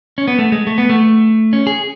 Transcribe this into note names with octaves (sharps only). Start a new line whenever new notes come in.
C#4
B3
A3
G#3
A3
B3
A3
C#4
G#4